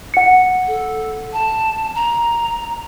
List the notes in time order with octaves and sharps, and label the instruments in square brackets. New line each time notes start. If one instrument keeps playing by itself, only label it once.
[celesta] F#5 C#7
[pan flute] A4
A5
A#5